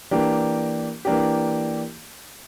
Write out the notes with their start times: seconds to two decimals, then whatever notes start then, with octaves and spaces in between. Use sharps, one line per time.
0.11 E3 A#3 D4 G4
1.05 E3 A#3 D4 G4